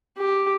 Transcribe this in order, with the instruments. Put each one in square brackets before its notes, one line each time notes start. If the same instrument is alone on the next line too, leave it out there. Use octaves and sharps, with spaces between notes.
[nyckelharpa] G4